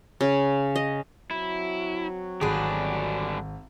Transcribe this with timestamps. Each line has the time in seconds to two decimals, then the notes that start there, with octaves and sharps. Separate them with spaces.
0.21 C#3
0.76 D#5
1.31 F#3 C4 E4 F#4
2.41 G#1 D3 G3 D4 G#4 B4